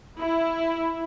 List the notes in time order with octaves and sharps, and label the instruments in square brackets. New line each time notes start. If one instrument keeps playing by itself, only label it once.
[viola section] E4